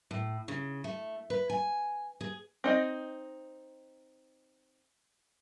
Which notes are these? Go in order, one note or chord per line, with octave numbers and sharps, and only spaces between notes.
A2
C#3
A3
B4
G#5
G#4
C4 D#4 D#5